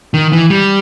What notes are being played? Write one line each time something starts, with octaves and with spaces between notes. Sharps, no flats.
D#3
E3
G3